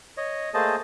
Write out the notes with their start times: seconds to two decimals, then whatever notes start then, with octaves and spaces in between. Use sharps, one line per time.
0.17 C#5 D#5
0.54 A3 A#3 G#4 C5 D#5 A5